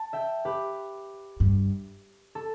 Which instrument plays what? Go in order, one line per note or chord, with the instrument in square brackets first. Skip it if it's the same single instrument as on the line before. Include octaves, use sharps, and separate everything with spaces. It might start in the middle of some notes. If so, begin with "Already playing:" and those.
Already playing: [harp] A5
E5 G5
G4 B4
[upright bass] G2
[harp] A4